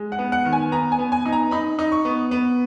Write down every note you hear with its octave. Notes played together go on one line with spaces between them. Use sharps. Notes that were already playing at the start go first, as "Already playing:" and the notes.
Already playing: G#3
F#5
B3
F#5
D#3
G#5
B3 A#5
G#5
B3
G#5
D#4
A#5
D#4 B5
D#4
C#6
B3
B3